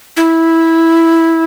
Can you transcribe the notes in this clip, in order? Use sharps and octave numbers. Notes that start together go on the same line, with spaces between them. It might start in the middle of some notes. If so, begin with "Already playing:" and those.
E4